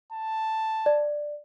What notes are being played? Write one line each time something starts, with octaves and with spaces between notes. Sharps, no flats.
A5
D5